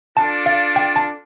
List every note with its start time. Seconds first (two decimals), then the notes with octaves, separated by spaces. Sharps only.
0.17 D4 F4 A4 D5 A5
0.46 F5
0.76 G5
0.96 A5